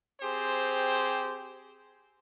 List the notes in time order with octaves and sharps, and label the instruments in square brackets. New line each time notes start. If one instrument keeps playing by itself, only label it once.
[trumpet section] C4 G4 G#4 C5